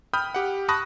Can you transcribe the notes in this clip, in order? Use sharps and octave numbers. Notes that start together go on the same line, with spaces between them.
G5 B5 D#6 F6 G6
G4 F#5
A5 B5 C#6 D#6 F#6 A#6